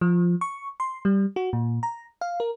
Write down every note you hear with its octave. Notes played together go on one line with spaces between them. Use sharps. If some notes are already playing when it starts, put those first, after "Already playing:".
F3
C#6
C6
G3
F#4
A#2
A#5
F5
A#4